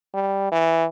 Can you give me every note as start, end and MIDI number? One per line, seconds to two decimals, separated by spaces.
0.14 0.48 55
0.52 0.85 52